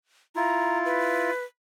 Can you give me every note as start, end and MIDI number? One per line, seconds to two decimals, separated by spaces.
0.36 1.31 64
0.36 1.31 65
0.36 0.78 82
0.85 1.44 71